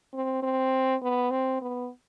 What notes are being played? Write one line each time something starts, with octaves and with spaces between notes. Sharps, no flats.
C4
C4
B3
C4
B3